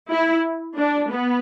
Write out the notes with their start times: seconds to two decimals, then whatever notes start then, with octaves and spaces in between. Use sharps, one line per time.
0.11 E4
0.76 D4
1.10 B3